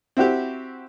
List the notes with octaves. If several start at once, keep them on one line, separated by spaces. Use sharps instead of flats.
C4 E4 F#4 G4